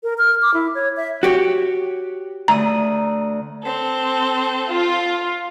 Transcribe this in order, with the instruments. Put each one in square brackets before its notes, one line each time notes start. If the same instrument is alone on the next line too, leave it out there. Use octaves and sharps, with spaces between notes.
[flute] A#4
F6
D6
E4
C#5
E5
[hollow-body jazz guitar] F#4 G4 C#5
[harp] D2 D#6 [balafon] A#5
[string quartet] C4 A4
[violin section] F4